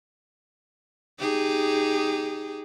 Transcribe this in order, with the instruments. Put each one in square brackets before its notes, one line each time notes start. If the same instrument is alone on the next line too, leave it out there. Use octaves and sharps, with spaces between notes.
[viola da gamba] D#4 G4 G#4